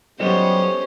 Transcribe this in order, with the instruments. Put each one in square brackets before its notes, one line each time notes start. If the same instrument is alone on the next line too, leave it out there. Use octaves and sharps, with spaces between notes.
[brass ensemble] F#3 G3 B3 [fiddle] C#4 C5 [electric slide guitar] G4 A4 D#5